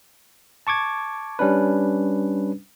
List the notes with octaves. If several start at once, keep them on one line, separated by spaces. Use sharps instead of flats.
A5 C#6 D6 G#6
G3 C#4 D4 B4